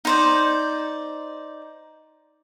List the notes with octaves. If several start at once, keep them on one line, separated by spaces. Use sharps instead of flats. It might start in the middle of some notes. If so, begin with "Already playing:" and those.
D#4 C5 D5